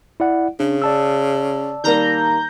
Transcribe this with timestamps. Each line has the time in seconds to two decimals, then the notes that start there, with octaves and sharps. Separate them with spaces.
0.20 E4 D5 F#5
0.60 C#3 D4
0.82 D5 A5 E6
1.84 D#3 G3 A#3 A#5 G6